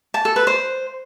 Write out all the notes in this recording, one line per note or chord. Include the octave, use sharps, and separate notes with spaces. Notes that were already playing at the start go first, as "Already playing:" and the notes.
A5
A4
B4
C5